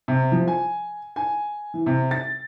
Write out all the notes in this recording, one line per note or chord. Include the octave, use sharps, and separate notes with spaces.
C3
F3
G#5
G#5
E3
C3
A6